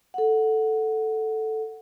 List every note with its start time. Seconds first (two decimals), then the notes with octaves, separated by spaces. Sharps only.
0.14 A4 F#5